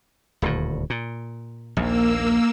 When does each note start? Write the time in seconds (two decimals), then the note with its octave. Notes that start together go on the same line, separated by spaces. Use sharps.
0.42 D#1 D2 A2
0.90 A#2
1.77 A#1 D#2 A#3 E6